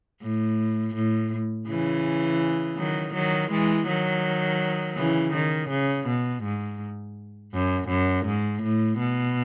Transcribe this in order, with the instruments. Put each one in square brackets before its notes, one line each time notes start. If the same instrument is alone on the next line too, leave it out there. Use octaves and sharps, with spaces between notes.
[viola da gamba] A2
A2
C#3 E3
D#3 F#3
D#3 F#3
E3 G#3
D#3 F#3
C#3 E3
D#3
C#3
B2
G#2
F#2
F#2
G#2
A2
B2